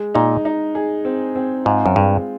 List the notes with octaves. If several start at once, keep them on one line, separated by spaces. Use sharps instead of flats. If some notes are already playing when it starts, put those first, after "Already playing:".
Already playing: G#3
A#2 D#4
D#4
G#4
C4
C4
G#2 F4
F#2
G2 G#3